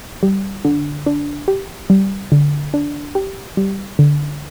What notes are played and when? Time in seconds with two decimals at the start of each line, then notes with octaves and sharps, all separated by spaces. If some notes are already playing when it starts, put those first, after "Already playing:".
0.23 G3
0.65 D3
1.06 D4
1.48 G4
1.90 G3
2.32 D3
2.74 D4
3.15 G4
3.57 G3
3.99 D3